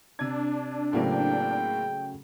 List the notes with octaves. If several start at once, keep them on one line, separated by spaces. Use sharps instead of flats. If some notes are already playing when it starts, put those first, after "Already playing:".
C3 D4 G#6
A2 C#3 F#3 A3 A#3 C4 G5